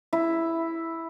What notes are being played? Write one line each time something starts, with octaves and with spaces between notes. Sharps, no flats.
E4